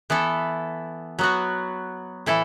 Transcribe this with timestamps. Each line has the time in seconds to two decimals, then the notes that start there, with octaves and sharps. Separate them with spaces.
0.10 E3 B3 E4 A4
1.19 F#3 B3 F#4
2.26 A2 E3 E4 A4